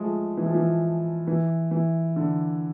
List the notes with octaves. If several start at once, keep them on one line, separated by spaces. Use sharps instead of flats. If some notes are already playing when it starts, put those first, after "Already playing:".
Already playing: F3 G#3 A3
E3
F3
E3
E3
E3
D3